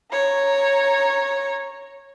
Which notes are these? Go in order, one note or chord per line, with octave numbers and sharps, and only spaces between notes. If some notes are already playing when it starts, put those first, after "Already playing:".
C#5 A#5